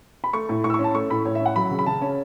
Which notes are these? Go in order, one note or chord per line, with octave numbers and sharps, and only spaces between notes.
B5
A3 C#6
A2
A2 C#6
E6
C#6
C#4
A5
A3 C#6
A2 B5
A2 C#5
E5
C#4
F#5
F#3 B5
C#3
B5
C#3 A5
C#4